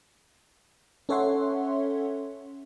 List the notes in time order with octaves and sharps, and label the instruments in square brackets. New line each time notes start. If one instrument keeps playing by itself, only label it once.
[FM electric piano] C#4 A4 C#5 E5 F#5 C6